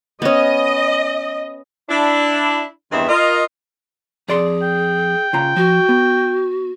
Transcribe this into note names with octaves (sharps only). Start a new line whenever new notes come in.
B3 C#4 D#5
D4 E4
E2 G2 D#3 C4 D#5 E5
F4 A#4 D#5
F2 G#4 D5 C6
G5
C#3 F4 A#5
F3 F#4
B3